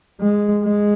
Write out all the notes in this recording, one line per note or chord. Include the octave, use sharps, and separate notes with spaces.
G#3
G#3